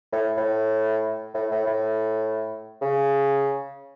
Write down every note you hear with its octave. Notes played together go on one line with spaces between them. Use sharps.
A2
A2
A2
A2
A2
C#3